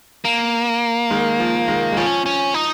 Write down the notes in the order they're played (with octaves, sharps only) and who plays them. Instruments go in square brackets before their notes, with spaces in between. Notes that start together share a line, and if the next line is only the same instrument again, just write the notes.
[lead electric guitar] A#3
[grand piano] D#3 G#3
F3
D#3 G#3
G#3
[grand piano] F3 [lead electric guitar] C#4
[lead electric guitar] C#4
D#4